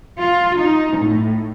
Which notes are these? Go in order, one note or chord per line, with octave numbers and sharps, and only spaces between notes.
F4
D#4
A2